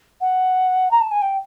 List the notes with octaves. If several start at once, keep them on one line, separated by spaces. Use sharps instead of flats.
F#5
A#5
A5
G#5
G5